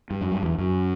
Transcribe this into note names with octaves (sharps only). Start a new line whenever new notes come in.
G2
F#2
G2
E2
F#2